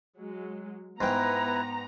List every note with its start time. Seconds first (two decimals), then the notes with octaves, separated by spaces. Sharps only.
0.17 F#3 G#3
1.01 G#2 B3 E4 B4 G5 A#5